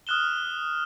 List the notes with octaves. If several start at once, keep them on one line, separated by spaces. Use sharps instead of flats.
D#6 F6 F#6 E7 G7